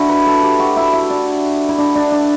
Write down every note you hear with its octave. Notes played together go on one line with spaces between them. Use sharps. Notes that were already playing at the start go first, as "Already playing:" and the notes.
Already playing: D4 E4 F#4 A4
B4
A4
G4
F#4
E4
E4
D4
E4
D4
D4
D4